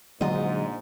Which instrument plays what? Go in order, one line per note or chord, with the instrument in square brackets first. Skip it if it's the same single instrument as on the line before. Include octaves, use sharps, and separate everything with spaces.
[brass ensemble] A#1 G#2 [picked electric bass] D3 F#3 G#3 [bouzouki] F4 D#5